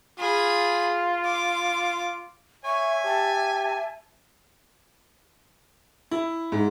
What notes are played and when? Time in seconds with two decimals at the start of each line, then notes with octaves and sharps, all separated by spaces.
0.19 F4 G#4 B5
1.25 D6
2.65 C#5 E5 G#5 C#6
3.05 G4 A5
6.11 E4
6.52 G#2